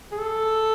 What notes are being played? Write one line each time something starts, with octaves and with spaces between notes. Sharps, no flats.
G#4
A4